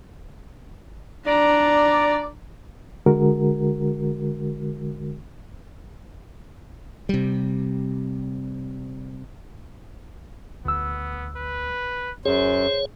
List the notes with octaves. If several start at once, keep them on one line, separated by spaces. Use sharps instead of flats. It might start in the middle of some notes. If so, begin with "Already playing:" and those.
D4 D5 A#5
D3 G#3 F#4 A#4
C3 G3
D2 B3 E6
B4
F#2 G#4 C5 C#5